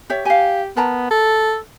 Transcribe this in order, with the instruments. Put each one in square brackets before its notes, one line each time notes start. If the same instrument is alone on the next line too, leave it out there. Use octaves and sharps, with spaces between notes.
[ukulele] G4 C#5 E5
[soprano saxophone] G4 [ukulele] F5 G#5
[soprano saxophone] B3 [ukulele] A#4 A5 A#5
[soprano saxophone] A4